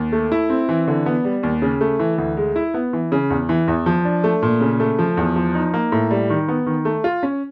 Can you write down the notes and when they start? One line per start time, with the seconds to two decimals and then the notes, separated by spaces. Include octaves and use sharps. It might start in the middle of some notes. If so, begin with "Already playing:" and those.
Already playing: D#2
0.12 A3
0.32 E4
0.50 C4
0.69 E3
0.88 D3
1.06 B3
1.24 G3
1.43 D#2
1.62 C#3
1.81 A3
1.99 E3
2.18 D2
2.37 G#3
2.56 E4
2.74 B3
2.93 E3
3.12 C#3
3.30 E2
3.49 E3
3.68 E2
3.86 F3
4.05 D4
4.24 A3
4.43 A#2
4.61 C#3
4.80 A3
4.99 F3
5.17 E2
5.36 F3
5.55 D#4
5.74 A#3
5.92 A2
6.11 G3
6.30 D#3
6.48 B3
6.66 D#3
6.85 A3
7.04 F4
7.23 C#4